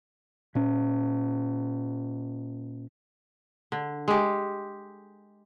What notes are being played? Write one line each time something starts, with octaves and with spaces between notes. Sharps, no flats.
A#2 C#4
D3
G#3 G4